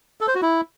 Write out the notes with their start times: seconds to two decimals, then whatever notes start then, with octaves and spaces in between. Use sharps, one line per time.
0.21 A4
0.28 C5
0.35 F#4
0.42 E4